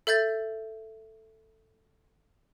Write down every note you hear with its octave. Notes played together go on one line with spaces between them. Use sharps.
A4 E5 G6 A6